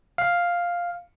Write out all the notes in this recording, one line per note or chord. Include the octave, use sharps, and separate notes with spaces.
F5